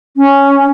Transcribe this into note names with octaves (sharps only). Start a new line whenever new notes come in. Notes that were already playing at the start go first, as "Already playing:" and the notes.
C#4